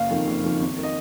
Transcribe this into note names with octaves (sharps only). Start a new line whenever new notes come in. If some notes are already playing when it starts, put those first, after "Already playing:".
Already playing: F#1 F5
F2 D#3
F#1
F2 D#3
G#1
D#3
D#5